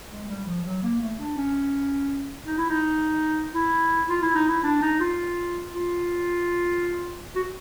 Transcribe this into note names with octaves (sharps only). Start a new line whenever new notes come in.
G#3
G3
F3
F#3
A#3
A3
D4
C#4
D#4
E4
D#4
E4
F4
E4
D#4
E4
D4
D#4
F4
F4
F#4